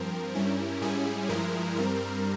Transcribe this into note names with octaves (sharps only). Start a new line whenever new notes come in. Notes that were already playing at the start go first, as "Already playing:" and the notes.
Already playing: G2 F3 C4 A#4
G2 G3 C#4 E4
G#2 G3 C#4 E4 G#4
G2 F3 G#3 E4 A#4
G2 G3 C4 A#4